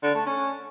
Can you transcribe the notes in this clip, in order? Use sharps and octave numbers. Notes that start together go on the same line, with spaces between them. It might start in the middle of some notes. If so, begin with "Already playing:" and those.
D3
A3
C#4